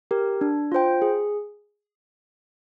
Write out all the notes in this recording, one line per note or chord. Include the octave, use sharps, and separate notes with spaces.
G4 A#4
D4
F4 C5 G5
G#4